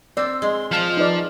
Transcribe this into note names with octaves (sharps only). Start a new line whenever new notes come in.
C4 D5 E6
G#3 C6
F3 A5 F6
D#4 B4 D5